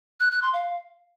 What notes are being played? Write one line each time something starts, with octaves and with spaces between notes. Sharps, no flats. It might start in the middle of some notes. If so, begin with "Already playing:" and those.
F#6
F#6
C6
F5